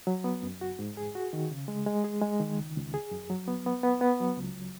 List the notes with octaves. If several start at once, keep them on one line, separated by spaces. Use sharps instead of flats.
F#3
B3
F#2
F#4
G#2
G#4
F#4
D#3
C#3
G#3
G#3
G#4
G#3
D#3
C#2
C#2
G#4
F#2
F#3
B3
B3
B3
B3
F#3
C#2